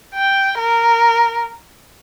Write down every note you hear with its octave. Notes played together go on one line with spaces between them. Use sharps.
G5
A#4